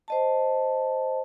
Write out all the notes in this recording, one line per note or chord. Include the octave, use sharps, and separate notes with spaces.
C5 D#5 A5